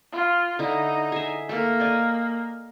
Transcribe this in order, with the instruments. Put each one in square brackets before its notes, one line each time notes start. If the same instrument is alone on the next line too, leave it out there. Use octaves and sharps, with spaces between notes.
[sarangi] F4
[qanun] D3 E4 [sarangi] D#4
[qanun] G#4 E5
[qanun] A3 A#4 [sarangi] A#3
[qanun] D5 D#5 G#5